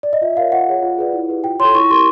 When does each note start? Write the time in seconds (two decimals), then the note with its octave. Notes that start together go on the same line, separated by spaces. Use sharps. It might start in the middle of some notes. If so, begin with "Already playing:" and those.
0.03 D5
0.13 D#5
0.22 F4 E5
0.37 A#4 C#5 F5
0.52 F4 F#5
0.68 G#4 C#5
0.83 F4
0.98 G#4 B4 D5
1.13 E4
1.29 G4 B4
1.44 F4 G5
1.60 A4 C#5 C6
1.75 E4 C#6
1.90 G4 A#4 C6